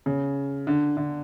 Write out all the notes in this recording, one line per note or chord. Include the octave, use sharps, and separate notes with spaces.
C#3
D3
D3